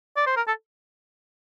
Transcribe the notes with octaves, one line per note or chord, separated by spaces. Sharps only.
D5
C5
A#4
A4